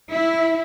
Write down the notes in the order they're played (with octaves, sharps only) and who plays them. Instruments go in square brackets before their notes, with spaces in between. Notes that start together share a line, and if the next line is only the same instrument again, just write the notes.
[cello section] E4